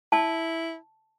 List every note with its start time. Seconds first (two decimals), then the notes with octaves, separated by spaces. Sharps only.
0.12 E4 A5